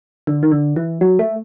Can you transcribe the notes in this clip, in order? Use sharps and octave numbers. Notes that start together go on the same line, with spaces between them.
D3
D#3
D3
E3
F#3
A3